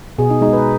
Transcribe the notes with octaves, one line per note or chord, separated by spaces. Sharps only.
B2 G#4
D#4
G#3 D#4
B4